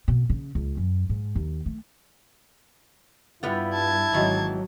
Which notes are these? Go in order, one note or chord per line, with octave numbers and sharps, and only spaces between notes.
B2
C#3
C#2
F#2
G#2
D#2
A3
G2 G3 B3 E4 F4
A5 G#6
G#1 D#3 E3 F#3